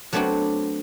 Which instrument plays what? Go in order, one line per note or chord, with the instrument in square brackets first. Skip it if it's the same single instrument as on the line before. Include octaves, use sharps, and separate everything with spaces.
[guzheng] F#3 A3 B3 C4 D4 F#4